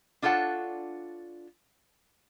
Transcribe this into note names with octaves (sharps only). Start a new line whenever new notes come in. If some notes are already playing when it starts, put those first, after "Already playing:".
D4 F4 A4 C#5 F#5